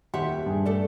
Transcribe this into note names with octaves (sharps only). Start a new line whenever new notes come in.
D#1 D#2 G4 E5 F#5 C6
G2 D4 G#4
A3 A4 D5